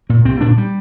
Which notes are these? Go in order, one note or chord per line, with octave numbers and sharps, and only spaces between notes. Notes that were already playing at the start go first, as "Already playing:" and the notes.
A#2 A#3
C2 C4
A#2 D4
G3